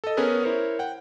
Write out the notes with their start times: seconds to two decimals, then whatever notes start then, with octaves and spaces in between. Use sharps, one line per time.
0.04 A4 D#5
0.17 B3 C#4 G#4 A#4 B4
0.43 E4 A#4 C5 C#5
0.79 F#5 G5